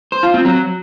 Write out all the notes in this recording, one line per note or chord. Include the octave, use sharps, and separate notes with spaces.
C5
F4
C4
F#3